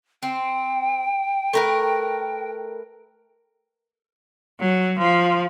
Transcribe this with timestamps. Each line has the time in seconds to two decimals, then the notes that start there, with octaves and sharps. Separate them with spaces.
0.23 C4 G5
1.53 A3 A#4 B4
4.60 F#3
4.99 F3